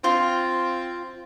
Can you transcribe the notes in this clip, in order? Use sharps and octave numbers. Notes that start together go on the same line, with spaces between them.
C4 F4